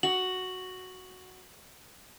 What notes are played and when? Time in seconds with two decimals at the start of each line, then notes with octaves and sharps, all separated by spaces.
0.03 F#4 F#7